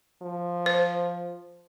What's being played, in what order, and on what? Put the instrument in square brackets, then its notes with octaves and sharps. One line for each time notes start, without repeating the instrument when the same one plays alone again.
[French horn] F3
[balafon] C5